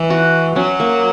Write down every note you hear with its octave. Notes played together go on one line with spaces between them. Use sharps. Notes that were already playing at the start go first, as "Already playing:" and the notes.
Already playing: E3
F#4
F#3 C#4
A#3